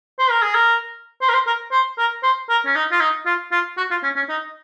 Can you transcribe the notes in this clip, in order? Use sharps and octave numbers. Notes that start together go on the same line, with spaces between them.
C5
A#4
G#4
A#4
C5
A#4
C5
A#4
C5
A#4
C5
A#4
C#4
D#4
F4
D#4
F4
F4
F#4
F4
C#4
C#4
D#4